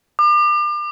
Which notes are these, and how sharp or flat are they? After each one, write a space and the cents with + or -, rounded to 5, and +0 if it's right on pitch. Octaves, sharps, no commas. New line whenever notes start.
D6 +40